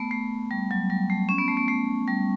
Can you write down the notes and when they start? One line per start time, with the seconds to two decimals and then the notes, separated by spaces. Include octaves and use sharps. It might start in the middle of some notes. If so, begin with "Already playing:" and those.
Already playing: A3 B3
0.11 A3
0.51 G3
0.71 F#3
0.90 G3
1.10 A3
1.29 C#4
1.38 B3
1.48 A3
1.57 B3
1.68 A3
2.07 G3